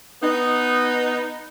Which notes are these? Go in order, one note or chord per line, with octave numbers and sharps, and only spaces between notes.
B3 D#4